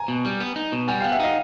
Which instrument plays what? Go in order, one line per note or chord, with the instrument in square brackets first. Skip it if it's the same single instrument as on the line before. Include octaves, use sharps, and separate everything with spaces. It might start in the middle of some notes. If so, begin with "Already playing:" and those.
Already playing: [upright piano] G#5 A#5
[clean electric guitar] B2
G3
B3
D#4
B2
[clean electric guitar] G3 [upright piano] F#5 G#5
[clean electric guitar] B3 [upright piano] F5 G5
[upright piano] E5 F#5
[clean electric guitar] D#4 [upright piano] D#5 F5